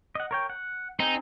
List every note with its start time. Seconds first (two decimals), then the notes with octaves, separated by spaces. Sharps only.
0.15 D#5 F#5
0.31 A#4 C#5 G5
0.50 F#5
1.00 C4 D#4 G#4